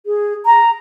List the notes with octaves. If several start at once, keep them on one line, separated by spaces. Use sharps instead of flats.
G#4
A#5